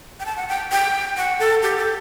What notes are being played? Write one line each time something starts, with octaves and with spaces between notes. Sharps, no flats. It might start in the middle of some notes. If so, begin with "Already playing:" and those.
G5
A5
F#5
G5
G5
F#5
A4
G4
A4